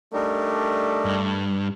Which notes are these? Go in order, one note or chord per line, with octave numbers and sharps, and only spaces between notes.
G3 A3 D4 D#4 A#4
G2